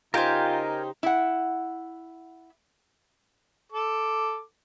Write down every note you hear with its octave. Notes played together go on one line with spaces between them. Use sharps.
C#3 D#4 F4 G4 A#4 C5 G5 G#5
E4 F#5
A4 D6